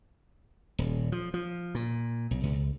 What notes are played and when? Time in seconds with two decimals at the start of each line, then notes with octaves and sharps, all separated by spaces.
0.79 D#1
1.12 F3
1.34 F3
1.75 A#2
2.31 B1
2.43 C#2